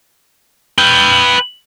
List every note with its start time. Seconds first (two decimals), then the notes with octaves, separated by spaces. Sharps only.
0.78 B4 G5